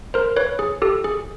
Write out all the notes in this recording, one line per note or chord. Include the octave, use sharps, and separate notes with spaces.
A#4 C5
B4 C#5
G#4
G4 A4
G#4